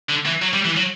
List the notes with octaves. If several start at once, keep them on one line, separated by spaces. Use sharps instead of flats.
D3
E3
F#3
G3
E3
F#3